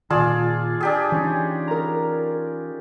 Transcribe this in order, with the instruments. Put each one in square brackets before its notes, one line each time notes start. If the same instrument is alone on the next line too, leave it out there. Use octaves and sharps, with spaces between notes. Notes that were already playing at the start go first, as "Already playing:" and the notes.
[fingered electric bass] A#2 D#3 [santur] F4 G#4 D5 [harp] A5 E6
[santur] D4 G4 G#4
[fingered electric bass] E3 [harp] C#4 D#4
[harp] A#4 A#5